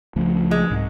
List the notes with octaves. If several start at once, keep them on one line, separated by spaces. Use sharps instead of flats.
C#2 C#3 F3 A3
G#3
C2 G#2